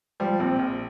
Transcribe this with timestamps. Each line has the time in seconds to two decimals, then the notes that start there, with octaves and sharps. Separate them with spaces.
0.20 F3 G3
0.39 A#1 C4
0.59 A#1